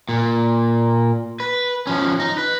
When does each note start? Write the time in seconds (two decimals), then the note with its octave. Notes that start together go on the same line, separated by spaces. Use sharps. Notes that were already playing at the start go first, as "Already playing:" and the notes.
0.09 A#2
1.40 B4
1.87 F3 C#4
2.20 D#4
2.38 B4